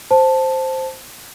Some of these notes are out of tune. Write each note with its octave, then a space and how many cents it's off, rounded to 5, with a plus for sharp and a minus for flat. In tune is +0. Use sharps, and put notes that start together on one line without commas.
C5 +0 A5 +0